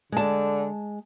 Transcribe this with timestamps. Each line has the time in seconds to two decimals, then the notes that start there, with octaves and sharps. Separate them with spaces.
0.12 D3 G#3 A5